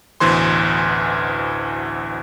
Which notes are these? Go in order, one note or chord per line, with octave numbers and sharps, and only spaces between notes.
A1 D2 B2 E3 C5 C6